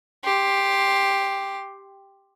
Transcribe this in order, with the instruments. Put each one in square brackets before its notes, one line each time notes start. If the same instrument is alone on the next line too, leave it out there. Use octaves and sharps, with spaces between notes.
[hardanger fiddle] G4 C6